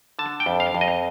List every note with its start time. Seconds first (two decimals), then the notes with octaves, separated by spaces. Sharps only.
0.19 D3 A5
0.40 G5
0.46 F2
0.60 F5
0.75 F2
0.81 D#5